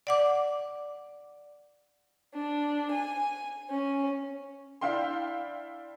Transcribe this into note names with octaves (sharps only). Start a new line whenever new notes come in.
D5 F#5 D6
D4
G#5
C#4
D4 E4 F5 G5 C6